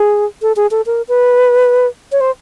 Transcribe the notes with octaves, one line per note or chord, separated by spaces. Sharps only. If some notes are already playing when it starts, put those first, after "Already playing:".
Already playing: G#4
A4
G#4
A4
A#4
B4
C#5
C5